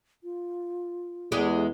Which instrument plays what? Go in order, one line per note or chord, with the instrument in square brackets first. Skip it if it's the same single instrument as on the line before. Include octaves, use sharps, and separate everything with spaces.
[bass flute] F4
[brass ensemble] E2 [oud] G#3 G4